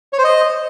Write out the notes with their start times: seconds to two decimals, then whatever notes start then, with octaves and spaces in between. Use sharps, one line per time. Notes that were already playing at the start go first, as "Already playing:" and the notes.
0.13 C#5
0.18 C5
0.24 D#5